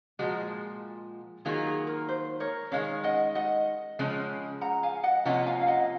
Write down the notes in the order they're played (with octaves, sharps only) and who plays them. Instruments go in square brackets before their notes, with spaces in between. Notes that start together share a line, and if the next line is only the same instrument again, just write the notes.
[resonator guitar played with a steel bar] A#2 F3 G#3 [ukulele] F#4
[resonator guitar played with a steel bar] D#3 F#3 A#3 F4 [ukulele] G#4
[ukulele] G#4
A#4
C5
A#4 C#5
[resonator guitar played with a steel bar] D#3 G#3 C#4 [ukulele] C#5 F5
[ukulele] D#5 F#5
D#5 F#5
[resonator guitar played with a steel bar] C#3 F3 G#3 C#4
[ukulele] F#5 A#5
F5 G#5
D#5 F#5
[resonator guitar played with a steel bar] C3 F3 A#3 C#4 F4 [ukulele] D#5 F#5
[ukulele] F5 G#5
F5
D#5 F#5